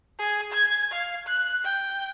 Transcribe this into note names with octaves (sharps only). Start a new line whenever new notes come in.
G#4
G#6
F5
F#6
G5